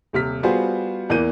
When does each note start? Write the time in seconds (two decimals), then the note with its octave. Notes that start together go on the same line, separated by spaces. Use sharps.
0.13 D#1 C3 F6 B6
0.43 G3 B3 F4 F#4 G#4 C5
1.10 E2 E3 A#3 G6 D#7